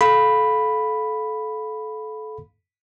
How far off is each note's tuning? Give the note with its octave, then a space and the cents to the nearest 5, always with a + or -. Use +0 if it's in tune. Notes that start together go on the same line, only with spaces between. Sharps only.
A4 -25 F5 +15 B5 +0